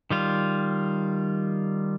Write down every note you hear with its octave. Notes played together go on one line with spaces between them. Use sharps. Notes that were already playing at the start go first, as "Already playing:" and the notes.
D#3 G3 F4